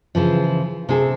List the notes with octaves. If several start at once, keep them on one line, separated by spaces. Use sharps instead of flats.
C#3 E3 F3
C3 G#4 A4